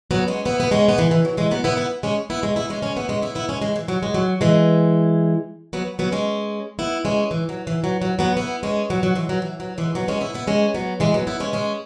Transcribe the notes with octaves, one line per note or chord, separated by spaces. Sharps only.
F#3 B3
G#3 C#4
B3 E4
B3
G#3 C#4
B3
E3 G#3
E3
F#3
E3 G#3
F#3 B3
B3 E4
B3 E4
G#3 C#4
B3 E4
G#3 C#4
B3 E4
G#3 C#4
G#3 C#4
B3 E4
G#3 C#4
B3 E4
B3 E4
G#3 C#4
E3 G#3
E3
F#3
G#3
F#3
E3 G#3
F#3 B3
F#3 B3
G#3 C#4
B3 E4
G#3 C#4
E3
F#3
E3
F#3
F#3
F#3 B3
B3 E4
G#3 C#4
F#3 B3
F#3
E3 G#3
F#3
E3
F#3
E3 G#3
F#3 B3
G#3 C#4
B3 E4
B3 E4
G#3 C#4
F#3 B3
E3 G#3
F#3 B3
B3 E4
G#3 C#4
G#3 C#4